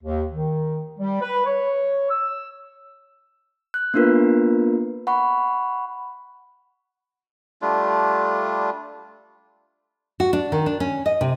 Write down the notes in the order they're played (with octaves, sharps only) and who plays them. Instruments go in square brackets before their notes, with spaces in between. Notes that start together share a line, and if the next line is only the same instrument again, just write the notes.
[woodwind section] D#2
D#3
G3
B4
C#5
E6
[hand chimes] F#6
A#3 B3 D4 F4 A#4 B4
F#5 B5 C#6
[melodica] G3 A3 D4 F4
[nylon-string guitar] F#4
D4
D#3
D4
C#4
D#5
C3